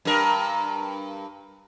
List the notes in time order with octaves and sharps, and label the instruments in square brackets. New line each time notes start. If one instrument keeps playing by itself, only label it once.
[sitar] G2 A#4